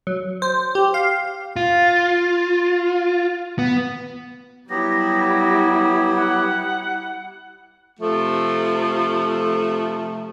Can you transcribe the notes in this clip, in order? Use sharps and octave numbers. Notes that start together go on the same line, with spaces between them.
F#3
C5
G4
F5
F4
B3
F#3 G3 B3 E4 G4 A#6
F#5
C3 F3 A3